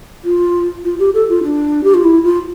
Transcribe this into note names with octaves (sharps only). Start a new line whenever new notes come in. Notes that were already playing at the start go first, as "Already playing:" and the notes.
F4
F4
G4
A4
F4
D4
G4
F4
E4
F4